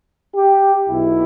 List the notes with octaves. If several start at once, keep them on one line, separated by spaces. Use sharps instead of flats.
G4
B1 B2 E4